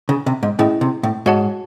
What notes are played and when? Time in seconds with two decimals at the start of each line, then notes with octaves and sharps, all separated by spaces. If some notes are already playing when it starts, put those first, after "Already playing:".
0.09 C#3
0.26 C3
0.43 G#2
0.59 A2 C#4 E4 G#4 D#5
0.81 C3
1.03 A2
1.26 G#2 F#4 C#5 F#5 A5